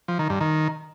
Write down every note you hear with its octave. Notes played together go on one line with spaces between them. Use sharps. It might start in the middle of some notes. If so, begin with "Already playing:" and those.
F3
D#3
G2
D#3